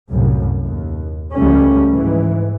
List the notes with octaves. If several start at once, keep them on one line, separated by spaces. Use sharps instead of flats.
C2 F#2 A2
D#2
C#2 F3 G3 A3 C#4
G#2 E3